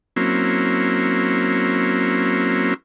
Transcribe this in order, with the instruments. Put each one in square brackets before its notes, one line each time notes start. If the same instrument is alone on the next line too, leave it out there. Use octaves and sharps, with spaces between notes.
[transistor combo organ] F#3 A#3 C4 C#4 E4